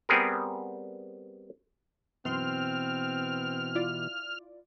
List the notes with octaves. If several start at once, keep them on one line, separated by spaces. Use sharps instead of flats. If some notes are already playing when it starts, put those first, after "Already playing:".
G3 B3 C4 G#4 A#4
F#2 B2 E3 C4 C6 F6
E4 F4 D5